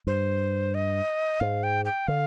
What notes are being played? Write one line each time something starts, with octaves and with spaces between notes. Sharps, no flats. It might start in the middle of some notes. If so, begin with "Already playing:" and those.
G2 C5
D#5
G#2 F5
G5
G5
D3 F5